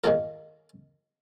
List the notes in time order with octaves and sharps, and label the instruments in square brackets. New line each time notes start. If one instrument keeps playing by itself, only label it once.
[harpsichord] G#2 D#3 A#3 F4 A#4